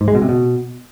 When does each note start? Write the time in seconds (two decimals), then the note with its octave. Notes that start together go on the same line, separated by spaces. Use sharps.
0.01 G#2
0.08 G#3
0.15 B2
0.22 C3
0.29 B2